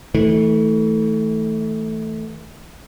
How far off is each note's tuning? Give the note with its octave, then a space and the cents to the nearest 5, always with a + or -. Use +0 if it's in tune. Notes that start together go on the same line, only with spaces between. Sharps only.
E3 -35 A3 +0